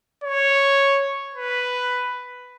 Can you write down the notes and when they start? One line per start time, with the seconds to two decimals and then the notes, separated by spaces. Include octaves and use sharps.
0.24 C#5
1.34 B4